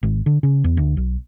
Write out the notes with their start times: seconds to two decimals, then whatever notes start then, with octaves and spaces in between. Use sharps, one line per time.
0.03 G#1
0.26 D3
0.43 C#3
0.64 E2
0.77 D2
0.97 B1